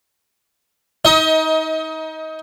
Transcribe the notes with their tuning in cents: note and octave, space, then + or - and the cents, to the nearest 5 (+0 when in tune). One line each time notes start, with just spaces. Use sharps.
D#4 +25 D#5 +40